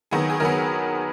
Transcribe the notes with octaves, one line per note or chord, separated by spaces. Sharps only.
D#3 F#3 B3 G#4
G#4
D#3 F#3 B3 A#4